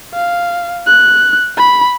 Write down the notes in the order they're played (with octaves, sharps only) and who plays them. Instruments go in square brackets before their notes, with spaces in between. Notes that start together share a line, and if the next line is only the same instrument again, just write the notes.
[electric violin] F5
F#6
B5